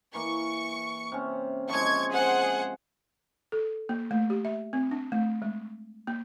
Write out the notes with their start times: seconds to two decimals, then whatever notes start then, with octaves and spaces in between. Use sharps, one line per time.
0.14 E3 A#3 C#6
1.12 C3 C#4
1.69 F3 G#3 C#6 G#6
2.12 G#4 C5 F#5
3.52 A4
3.89 A#3
4.11 A3
4.30 G4
4.45 E5
4.73 C4
4.91 D4
5.12 A3
5.42 G#3
6.07 A#3